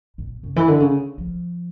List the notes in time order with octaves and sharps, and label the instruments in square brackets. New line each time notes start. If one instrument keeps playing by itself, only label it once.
[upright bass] A#2
C#3
E3
D3
C#3
F3